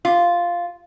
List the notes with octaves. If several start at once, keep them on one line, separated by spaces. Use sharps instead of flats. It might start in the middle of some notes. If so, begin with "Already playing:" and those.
F4